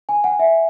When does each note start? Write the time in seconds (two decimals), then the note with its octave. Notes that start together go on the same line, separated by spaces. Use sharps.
0.09 G#5
0.24 F#5
0.39 E5